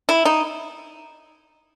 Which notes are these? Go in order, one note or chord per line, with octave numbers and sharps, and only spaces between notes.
E4
D#4